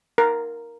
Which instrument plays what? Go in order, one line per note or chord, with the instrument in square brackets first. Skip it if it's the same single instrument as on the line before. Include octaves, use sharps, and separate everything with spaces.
[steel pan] A#4